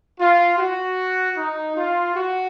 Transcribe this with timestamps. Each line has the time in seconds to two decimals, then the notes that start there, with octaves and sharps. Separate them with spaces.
0.19 F4
0.58 F#4
1.37 D#4
1.76 F4
2.15 F#4